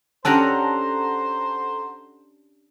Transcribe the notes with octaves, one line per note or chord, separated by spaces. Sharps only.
C#4 D4 G4 A4 C5 F#5 A#5